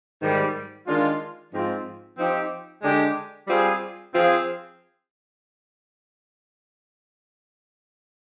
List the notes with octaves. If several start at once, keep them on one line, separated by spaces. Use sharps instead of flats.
G#2 D#3 G3
D#3 G#3 D4 F4
G#2 F3 C4 F4
F3 C4 D#4 G4
D3 G#3 D4 G4
G3 C4 F4 G#4
F3 C4 F4 G#4